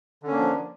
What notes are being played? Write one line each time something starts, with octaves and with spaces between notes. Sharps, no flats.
D3 F3 A#3 C#4 D4